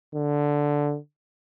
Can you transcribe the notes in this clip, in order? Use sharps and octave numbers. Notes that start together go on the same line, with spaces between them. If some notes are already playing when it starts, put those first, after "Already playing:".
D3